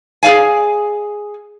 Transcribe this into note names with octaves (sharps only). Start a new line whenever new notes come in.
G#4 A4 D5 F5 G#5